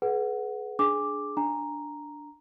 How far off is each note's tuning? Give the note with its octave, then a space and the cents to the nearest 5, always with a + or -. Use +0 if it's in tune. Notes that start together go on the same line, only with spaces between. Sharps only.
G#4 +35 B4 +0 F#5 +0
D4 +0 G#4 +15 D6 +0
D4 +0 A#5 +0